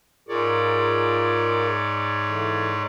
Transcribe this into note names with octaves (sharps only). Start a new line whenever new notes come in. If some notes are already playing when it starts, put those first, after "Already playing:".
G#2 F4 G#4 A#4 C#5 D5
D3 E3